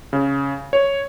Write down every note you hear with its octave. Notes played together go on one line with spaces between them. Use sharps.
C#3
C#5